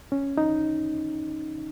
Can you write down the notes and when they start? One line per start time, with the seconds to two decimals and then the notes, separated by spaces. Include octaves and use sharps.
0.12 C#4
0.38 D#4